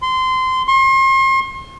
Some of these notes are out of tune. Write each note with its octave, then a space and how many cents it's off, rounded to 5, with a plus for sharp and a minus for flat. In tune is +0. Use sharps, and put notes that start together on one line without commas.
C6 -20
C6 +40